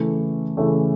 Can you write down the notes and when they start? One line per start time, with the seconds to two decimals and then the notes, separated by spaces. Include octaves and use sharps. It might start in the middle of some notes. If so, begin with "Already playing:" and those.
Already playing: C#3 E3 A3
0.57 C#3 E3 A3